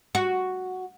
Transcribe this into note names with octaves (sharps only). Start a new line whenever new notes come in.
F#4